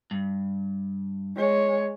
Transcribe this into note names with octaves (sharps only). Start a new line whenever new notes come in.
G2
G#3 C#5